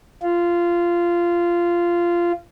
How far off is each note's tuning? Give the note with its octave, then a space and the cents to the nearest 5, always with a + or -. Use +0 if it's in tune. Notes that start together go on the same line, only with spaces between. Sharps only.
F4 -15